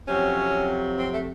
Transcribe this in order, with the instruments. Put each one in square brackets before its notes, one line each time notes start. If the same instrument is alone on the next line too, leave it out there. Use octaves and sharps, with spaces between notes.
[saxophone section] F2 C3 F#3 C#4
C4
A3